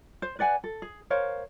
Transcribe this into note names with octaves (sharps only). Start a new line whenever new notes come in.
C5
B4 D5 F#5 G#5
A4
G#4
A#4 C5 C#5 F5